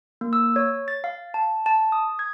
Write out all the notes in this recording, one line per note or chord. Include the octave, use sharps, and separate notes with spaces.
A#3
E6
C#5
A6
F5
A5
A5
D#6
G#6